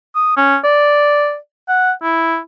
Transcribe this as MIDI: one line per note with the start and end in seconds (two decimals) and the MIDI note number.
0.15 0.32 87
0.37 0.57 61
0.64 1.36 74
1.68 1.92 78
2.02 2.38 64